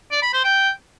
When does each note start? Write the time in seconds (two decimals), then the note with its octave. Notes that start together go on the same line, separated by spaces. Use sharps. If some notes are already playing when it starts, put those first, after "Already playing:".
0.11 D5
0.22 B5
0.33 C5
0.44 G5